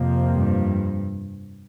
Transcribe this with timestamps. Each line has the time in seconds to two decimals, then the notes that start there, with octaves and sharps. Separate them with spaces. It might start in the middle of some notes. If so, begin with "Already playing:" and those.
Already playing: F2 C3 F3 A#3
0.35 G2